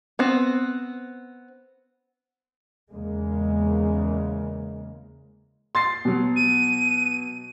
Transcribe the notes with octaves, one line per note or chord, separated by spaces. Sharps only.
B3 C4
E2 C#3 G#3 A#3
C6 A6 C7
B2 F#3
D#7